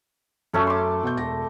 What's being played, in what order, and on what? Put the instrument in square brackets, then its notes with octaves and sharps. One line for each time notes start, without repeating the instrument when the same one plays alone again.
[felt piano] F#2 A5 [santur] A3 C#4 A4
[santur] C6 D6
[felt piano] B2 B3 G6
E1 A#6